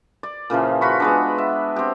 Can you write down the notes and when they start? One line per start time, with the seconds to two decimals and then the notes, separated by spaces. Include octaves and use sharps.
0.23 D5
0.50 A#2 C#3 E3 F3
0.81 F4 F#4 B5 C#6
1.00 G#3 B3 D4
1.38 E5
1.76 C4 G4